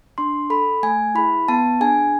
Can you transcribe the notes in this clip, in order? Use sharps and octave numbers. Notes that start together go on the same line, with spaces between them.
D4 C6
A4 B5
A3 G#5
E4 G#4 B5
B3 A5
D4 G#4 G#5